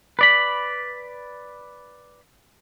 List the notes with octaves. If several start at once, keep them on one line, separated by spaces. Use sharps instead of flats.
B4 D5 B5